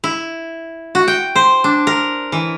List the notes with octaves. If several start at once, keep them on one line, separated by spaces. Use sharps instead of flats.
E4
F#4
G5
C5
D4
A#4
E3